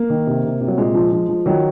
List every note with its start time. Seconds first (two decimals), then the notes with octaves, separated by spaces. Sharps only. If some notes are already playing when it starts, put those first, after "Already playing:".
Already playing: A#3
0.10 D#3
0.27 C3
0.44 C3
0.61 C3
0.67 F#3
0.77 A#2 G#3
0.94 F3
1.12 F3
1.28 F3
1.46 D#3 F#3